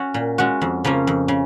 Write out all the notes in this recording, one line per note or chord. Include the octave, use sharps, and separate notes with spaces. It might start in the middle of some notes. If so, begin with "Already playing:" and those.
Already playing: C#4 F#4
A#2
G#3 C#4 F#4
F2
C#3 F3 A#3 C#4
F2
C#3